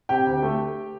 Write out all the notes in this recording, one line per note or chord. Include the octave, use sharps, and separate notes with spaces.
C3 G4 G5
D2
A3